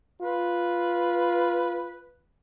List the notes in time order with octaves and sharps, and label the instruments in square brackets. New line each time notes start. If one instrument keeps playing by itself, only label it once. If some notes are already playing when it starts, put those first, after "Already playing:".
[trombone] F4 [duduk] B4